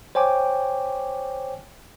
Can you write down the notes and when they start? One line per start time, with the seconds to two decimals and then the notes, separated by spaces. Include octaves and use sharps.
0.15 C5 C#5 G5 G#5 D6